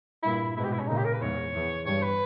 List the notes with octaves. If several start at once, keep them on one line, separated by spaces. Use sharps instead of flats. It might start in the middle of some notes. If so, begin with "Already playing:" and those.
G2 A#2 E4
G#2 B2 E4
G4
E4
C#4
A#2 C#3 D#4
G4
A#4
B4
E2 G#2 C#5
E2
G2 C#5
B4